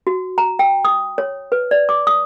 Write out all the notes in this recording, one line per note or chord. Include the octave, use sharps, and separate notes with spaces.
F#4
A#5
G5
D#6
C#5
B4
D5
D6
D#6